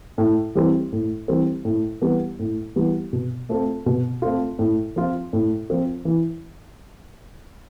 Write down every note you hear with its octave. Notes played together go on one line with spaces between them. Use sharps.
A2
E3 G3 C4
A2
E3 G3 C4
A2
E3 G3 B3
A2
E3 G3 B3
B2
A3 C4 F4
B2
A3 C4 F4
A2
F3 C4 F4
A2
F3 C4 F4
E3